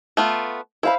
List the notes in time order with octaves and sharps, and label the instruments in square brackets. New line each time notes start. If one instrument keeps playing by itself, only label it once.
[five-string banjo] A3 B3 F4
[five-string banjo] E4 [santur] C5 F5 B5